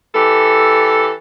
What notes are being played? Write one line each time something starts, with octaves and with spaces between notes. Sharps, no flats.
E3 G4 A4